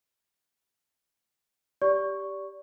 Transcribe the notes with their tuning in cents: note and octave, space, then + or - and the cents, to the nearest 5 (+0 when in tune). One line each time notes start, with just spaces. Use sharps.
G4 +0 D5 -25 C#6 +0